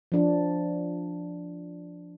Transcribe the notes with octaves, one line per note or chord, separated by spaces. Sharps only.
F3 D4